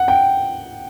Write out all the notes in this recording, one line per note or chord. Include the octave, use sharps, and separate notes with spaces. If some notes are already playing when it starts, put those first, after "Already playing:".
Already playing: F#5
G5